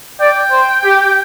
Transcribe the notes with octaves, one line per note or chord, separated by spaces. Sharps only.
D5 G5
C5
G4